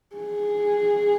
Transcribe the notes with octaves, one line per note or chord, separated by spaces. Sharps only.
G#4